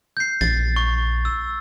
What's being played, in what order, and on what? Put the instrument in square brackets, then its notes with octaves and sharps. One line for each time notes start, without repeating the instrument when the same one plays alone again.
[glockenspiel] G6 C7
[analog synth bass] A#1 [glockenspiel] A6
[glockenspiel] C#6
E6